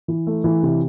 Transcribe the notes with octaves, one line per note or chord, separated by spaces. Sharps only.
E3
A3
E3
C3